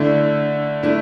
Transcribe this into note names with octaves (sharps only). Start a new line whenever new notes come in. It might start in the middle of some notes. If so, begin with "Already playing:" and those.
Already playing: D3 A3 D4 E4
A3 D4 E4